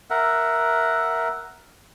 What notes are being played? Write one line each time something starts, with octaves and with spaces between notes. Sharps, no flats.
A#4 E5 F#5